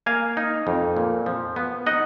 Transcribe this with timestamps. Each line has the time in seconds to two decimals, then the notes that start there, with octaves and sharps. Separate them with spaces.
0.06 A#3 F5 G#5
0.37 D#4
0.67 F2
0.96 A#2
1.26 F3
1.56 B3
1.86 D#4 D#5 F#5